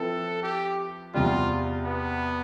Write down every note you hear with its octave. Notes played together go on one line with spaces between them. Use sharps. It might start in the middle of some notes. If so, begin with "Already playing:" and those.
Already playing: F3 C4 E4 A4 B4
G4
E2 C3 G3 F4
B3